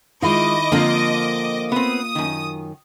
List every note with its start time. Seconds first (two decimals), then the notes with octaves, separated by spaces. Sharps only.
0.22 D#3 G#3 E4 F4 D#5 D6
0.72 D3 F3 A#3 C4 F4 A#4
1.72 B3 C4 D#6
2.15 F#2 D#3